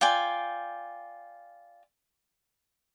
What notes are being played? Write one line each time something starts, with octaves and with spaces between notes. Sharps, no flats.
F4 D5 G5 G#5